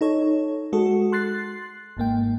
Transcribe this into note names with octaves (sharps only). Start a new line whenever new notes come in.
D#4 A4 C#5
G#3 F#4 A4
C6 F#6 A6 C7
G#1 G#2 A#3 G5